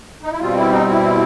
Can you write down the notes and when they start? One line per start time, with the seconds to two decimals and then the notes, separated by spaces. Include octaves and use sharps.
0.23 D#4
0.32 E4
0.39 B2 G3 C4 F4
0.56 E4
0.71 D#4
0.88 E4